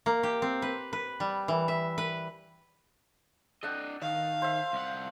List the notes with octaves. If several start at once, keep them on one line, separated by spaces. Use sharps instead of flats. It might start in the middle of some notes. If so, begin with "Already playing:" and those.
A#3
G4
C4
B4
B4
G3
E3
E5
B4
D4 A4 D#5 F#5 G5
D#3 F5
C5 E5
C2 F#5